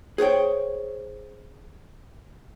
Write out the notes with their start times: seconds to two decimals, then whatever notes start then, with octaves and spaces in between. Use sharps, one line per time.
0.18 G#4 C5 C#5 G5